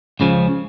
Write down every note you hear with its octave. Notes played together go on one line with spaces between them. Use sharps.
C#2 C#3 F3